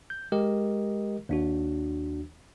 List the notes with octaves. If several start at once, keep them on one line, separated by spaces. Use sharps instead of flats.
G6
G#3 G4 A#4 D#5
D#2 D4 F#4